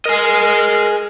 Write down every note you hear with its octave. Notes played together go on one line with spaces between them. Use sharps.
G#4 A#4 D#5